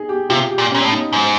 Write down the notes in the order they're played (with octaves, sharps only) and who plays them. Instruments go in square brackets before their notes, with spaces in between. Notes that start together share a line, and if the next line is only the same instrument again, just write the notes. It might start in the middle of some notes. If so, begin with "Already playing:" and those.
Already playing: [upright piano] D#4 G#4
G4
[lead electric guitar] C3 [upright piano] F4
[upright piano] G4
[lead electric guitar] A#2
[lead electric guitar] A#2 [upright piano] C#4
[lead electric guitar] A2
[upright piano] D#4
[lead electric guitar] G#2